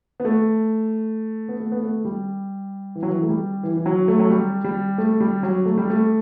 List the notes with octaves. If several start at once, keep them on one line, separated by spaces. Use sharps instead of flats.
B3
A3
B3
A3
B3
A3
G3
E3
F#3
E3
A3
G3
E3
E3
F#3
A3
F#3
G3
G3
A3
G3
F#3
A3
G3
A3